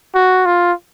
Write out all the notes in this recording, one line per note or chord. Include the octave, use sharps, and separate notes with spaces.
F#4
F4